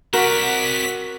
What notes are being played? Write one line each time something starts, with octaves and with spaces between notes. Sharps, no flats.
C4 F#4 A#4 D5 C#6 B6